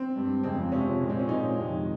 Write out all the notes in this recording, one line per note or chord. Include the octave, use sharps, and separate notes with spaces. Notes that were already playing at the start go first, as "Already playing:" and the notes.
Already playing: C4
G2 G3
F2 C#3 G#3 C4
C3 F3 G#3 C#4
A#2 G#3
C4
C#4
A#2 G#3 D#4
F2 C3 D#3 G#3